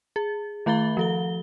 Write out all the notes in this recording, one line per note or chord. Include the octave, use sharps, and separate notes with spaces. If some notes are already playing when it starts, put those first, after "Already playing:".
G#4
D#3 A3 F5 B5 A6 G7
F3 A4 G7